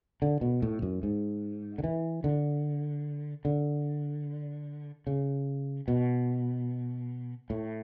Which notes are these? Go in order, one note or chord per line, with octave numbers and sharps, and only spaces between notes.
D3
B2
A2
F#2
G#2
D3
E3
D3
D3
C#3
B2
A2